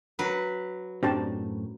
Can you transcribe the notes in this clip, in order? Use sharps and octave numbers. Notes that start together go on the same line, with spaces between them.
F#3 B4
F#2 A2 C4 D4 G4 A5